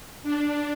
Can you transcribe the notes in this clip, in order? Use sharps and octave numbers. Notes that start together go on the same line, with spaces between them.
D4